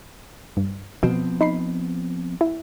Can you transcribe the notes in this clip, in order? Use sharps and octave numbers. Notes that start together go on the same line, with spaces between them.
G2
B2 F3 B3 C4
D#4 B5 C7
E4